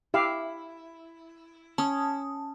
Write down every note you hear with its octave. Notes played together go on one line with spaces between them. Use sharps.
E4 G4 F5
C#4 A5 D#6